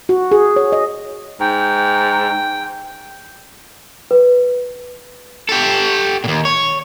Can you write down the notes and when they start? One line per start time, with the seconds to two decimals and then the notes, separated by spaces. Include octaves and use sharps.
0.09 F#4
0.32 G#4
0.56 C#5
0.72 D#5
1.40 G#2 G5
4.11 B4
5.49 G4 A4
6.24 D#2 A#2
6.45 C#5